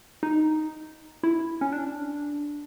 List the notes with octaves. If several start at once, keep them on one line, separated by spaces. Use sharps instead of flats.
D#4
E4
C#4
D4